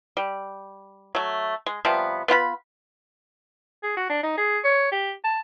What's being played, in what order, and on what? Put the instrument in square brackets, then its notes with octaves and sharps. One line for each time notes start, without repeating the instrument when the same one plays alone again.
[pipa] G3
F#3 A3
G#3
C3 F3 G3 B3
B3 F4 F#5 B5
[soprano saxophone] G#4
F#4
D4
D#4
G#4
C#5
G4
A5